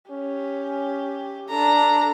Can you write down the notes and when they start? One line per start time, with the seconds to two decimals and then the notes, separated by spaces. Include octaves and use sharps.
0.11 C#4 G4
1.49 D4 A4 A#5